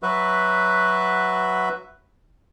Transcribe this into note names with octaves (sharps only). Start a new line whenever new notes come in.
F#3 F#4 B4 E5